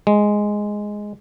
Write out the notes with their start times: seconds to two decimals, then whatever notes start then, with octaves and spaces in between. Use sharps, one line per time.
0.07 G#3